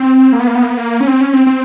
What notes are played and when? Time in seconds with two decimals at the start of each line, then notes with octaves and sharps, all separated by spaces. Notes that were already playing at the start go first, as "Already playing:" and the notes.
Already playing: C4
0.33 A#3
0.40 B3
0.47 A#3
0.55 B3
0.62 A#3
0.70 B3
0.77 A#3
1.00 C#4
1.08 C4
1.21 C#4
1.34 C4
1.47 C4